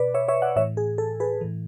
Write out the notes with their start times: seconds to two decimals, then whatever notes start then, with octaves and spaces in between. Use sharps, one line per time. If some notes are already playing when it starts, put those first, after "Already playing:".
Already playing: B2 B4 D5
0.14 C#5 E5
0.28 C#5 E5
0.42 D5 F#5
0.56 A2 E3 C#5 E5
0.77 G#4
0.98 A4
1.20 G#4 B4
1.41 A2 E3